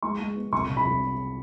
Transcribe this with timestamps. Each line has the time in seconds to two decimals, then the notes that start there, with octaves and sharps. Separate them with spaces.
0.03 G#3 C#6
0.20 G#3
0.36 B3
0.52 C2 C#6
0.69 C3
0.77 B5
0.85 C2